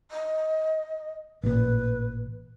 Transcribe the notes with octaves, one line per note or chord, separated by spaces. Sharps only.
D#5
A1 A#2 B4